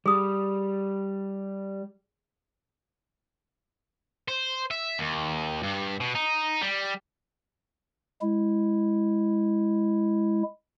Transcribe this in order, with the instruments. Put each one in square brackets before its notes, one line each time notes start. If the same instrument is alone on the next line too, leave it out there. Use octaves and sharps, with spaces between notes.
[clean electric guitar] G3 [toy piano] G#4 D#6
[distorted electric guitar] C5
E5
D#2
G2
B2
D#4
G3
[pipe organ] G#3 E4